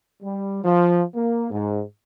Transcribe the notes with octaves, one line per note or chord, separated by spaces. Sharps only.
G3
F3
A#3
G#2